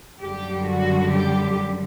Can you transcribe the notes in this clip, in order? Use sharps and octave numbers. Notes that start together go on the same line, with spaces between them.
F#2 D3 G3 G4
F#4
G4